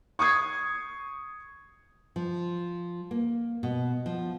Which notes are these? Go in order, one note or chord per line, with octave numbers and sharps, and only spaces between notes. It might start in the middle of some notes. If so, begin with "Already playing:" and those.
C#6 D#6 G#6 C7
F3
A#3
B2
F3